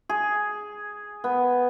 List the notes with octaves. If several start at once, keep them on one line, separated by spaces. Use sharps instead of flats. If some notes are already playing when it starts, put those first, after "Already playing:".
G#4
B3